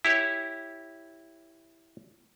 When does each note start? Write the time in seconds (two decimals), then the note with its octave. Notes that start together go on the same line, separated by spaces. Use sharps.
0.05 E4 G4 C#5